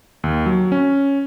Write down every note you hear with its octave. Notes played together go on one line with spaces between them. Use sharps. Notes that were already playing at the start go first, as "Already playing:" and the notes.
D#2
F#3
C#4